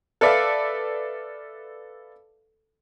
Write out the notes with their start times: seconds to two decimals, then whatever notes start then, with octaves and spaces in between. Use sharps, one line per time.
0.21 A4 B4 D5 E5 F5